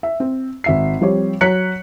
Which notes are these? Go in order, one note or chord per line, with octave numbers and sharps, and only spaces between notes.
E5
C4
G#1 E5 C7
F3 G3 C4 G4 C#5
F#3 C#5 A#5 F#6 B6 C#7